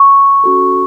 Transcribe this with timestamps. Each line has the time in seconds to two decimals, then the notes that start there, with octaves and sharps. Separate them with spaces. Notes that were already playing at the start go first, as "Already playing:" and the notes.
Already playing: C#6
0.44 C#4 F#4 A4